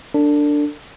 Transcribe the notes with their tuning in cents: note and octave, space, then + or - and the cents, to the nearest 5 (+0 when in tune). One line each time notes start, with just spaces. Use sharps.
D4 +0 A4 +45